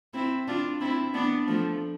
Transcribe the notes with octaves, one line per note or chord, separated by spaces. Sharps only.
C4 E4
D4 F4
C4 E4
B3 D4
F3 A3